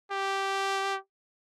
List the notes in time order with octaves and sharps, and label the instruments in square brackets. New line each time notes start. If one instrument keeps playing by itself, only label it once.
[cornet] G4